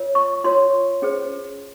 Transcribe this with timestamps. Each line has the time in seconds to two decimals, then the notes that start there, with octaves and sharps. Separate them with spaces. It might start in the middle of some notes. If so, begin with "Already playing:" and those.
Already playing: F4 A#4 C#5
0.15 C#6
0.44 F4 A#4 C#5 C6
1.02 C#4 G#4 C5